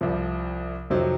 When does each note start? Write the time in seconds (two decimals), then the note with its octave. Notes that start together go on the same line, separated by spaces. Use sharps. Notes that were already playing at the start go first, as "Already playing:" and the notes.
0.01 C2 C3 F3
0.90 F2 C3 D#3 F#3 C4